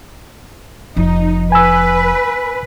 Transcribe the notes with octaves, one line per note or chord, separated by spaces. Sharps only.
F1 F3 D#4
B4 G#5 E6